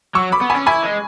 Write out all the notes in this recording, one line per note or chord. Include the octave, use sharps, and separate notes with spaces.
F#3 C#6 E6
B5 D6
B3
C#4 G#5 B5
E4 G#5 B5
G#3